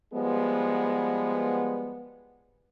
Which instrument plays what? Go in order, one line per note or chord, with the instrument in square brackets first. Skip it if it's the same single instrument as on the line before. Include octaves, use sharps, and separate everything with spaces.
[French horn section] F3 G3 G#3 B3